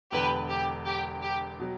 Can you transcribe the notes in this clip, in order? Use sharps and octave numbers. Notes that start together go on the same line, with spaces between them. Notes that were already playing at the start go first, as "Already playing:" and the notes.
E1 E2 D3 G4 B4
G4
G4
G4
B2 F#3